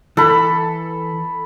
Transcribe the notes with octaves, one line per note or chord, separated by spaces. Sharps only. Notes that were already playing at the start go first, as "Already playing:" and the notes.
E3 A4 B5